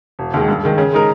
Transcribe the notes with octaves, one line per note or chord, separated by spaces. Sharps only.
E1
D#2 D#3 G#3
G2
D#3 G#3
C#3
G#3 D#4 A#4